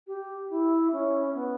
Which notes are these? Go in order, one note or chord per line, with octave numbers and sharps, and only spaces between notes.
G4
E4
C#4
B3